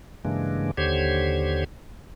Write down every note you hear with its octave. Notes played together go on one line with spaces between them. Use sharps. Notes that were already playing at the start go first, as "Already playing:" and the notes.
G2 C#3 E3 G#3 A#3 D4
D#2 D3 G4 C5 C#5 G#6